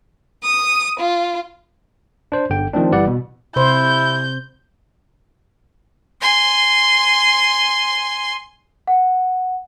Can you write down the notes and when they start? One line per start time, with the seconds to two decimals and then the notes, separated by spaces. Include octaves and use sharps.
0.43 D#6
0.99 F4
2.32 D4 C5
2.50 G1 D3 G5
2.73 D#3 F3 A3 C4 D4
2.92 G1 E3 G3 D5 F#5
3.07 B2
3.56 C3 E4 C5 G6
6.21 G#5 C6
8.87 F#5